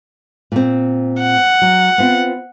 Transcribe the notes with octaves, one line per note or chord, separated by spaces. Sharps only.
A#2 C4
F#5
F#3
B3 C4 F4